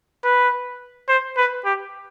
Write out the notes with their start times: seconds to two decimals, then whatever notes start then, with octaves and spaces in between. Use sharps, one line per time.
0.24 B4
1.09 C5
1.37 B4
1.65 G4